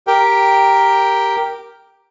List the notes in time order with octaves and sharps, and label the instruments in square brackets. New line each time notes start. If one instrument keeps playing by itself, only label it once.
[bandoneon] G4 A#4 G5